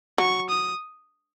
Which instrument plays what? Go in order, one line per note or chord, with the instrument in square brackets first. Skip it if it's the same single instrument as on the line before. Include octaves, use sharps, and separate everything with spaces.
[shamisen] F#3 [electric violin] C#6
[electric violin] D#6